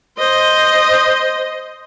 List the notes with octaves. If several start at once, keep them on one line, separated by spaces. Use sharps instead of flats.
C5 D#5